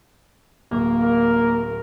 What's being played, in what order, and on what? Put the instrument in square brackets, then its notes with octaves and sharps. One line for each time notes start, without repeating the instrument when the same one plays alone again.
[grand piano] D1 [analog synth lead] A#3
[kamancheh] A#4